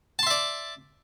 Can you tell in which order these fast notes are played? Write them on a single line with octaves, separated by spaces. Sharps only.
A5 C6 E5 D5